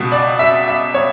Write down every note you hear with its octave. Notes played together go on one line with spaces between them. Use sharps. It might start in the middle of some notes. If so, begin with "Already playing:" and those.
Already playing: C#2 B2
D5
E5
E5
C#5